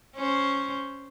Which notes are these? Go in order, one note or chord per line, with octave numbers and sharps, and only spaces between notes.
C#4 C5